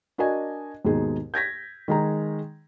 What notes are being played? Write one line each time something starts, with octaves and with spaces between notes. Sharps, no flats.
D4 F#4 A#4 D#5 G#5
D#2 G#2 B2 D#4 G#4
G6 G#6 A#6 B6
D#3 G#3 A#5